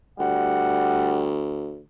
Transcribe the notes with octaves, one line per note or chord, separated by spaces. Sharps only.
D2 G3 F#5